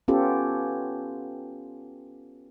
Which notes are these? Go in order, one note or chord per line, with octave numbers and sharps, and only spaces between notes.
B3 C#4 F4 G4 A4